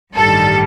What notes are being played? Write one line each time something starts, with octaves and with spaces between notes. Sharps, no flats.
A1 G2 D#3 G3 A4